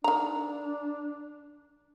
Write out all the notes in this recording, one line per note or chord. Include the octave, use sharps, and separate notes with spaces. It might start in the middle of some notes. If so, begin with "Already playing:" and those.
D#3 D4 A#5